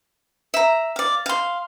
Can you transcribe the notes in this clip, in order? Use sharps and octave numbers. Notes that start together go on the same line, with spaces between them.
E5 A#5
D5 F5
F5 C6